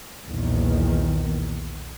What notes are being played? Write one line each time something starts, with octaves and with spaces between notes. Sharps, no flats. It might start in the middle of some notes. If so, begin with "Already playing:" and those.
B1 E2 A#2 D#3